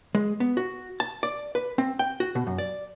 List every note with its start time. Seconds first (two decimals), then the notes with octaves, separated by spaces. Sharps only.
0.15 G#3
0.40 B3
0.57 F#4
1.00 A5
1.23 D5
1.55 B4
1.78 C4
1.99 G5
2.20 F#4
2.35 B2
2.47 F#2
2.58 D5